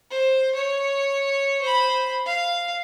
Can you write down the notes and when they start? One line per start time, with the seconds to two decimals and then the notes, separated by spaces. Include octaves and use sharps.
0.10 C5
0.55 C#5
1.61 C5 B5
2.26 F5